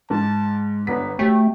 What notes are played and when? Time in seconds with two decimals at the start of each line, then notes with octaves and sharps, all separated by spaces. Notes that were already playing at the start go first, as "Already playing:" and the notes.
0.10 G#2 A5
0.87 G1 D3 B3 B6
1.19 A3 F#4 G4 C#5 G5